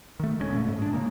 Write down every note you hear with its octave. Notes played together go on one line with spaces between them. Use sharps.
D#3 A3
D#1 G#3 B3 C#4
A#2 F3 A3
G#2 A3
G#3 D4
C#3 E3 G#3 A#3